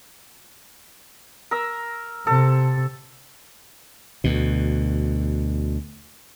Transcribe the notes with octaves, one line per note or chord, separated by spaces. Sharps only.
A#4 E6
C3 A4
D2 B2